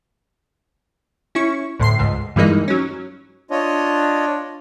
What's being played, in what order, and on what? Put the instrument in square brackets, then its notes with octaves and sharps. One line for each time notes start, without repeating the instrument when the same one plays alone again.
[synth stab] C#4 E4 C#6
D2 A2 C6 C7
C#2 G#2
G2 E3 G3 G#3 A#3 D#4
F#3 C#4
[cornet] D4 [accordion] F4 C#5 D#5